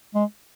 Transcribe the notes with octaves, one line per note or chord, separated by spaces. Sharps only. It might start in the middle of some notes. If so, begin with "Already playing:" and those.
G#3